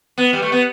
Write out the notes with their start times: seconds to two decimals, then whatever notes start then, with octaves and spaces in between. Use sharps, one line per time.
0.18 B3
0.33 G3
0.42 A3
0.52 B3